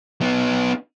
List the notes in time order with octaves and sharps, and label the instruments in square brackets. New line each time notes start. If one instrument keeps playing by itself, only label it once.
[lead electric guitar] B3 D#4